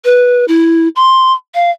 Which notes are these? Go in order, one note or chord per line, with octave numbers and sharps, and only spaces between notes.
B4
E4
C6
F5